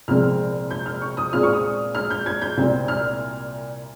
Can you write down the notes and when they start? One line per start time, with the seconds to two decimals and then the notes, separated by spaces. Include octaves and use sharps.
0.08 C2 A#2 F3 G#3 C4 F6
0.70 G6
0.86 F6
1.02 C#6
1.17 D#6
1.33 A#2 G#3 C4 F4 F6
1.43 C#6
1.53 D#6
1.95 F6
2.10 G6
2.26 G#6
2.42 G6
2.57 C2 A#2 G3 C4
2.88 F6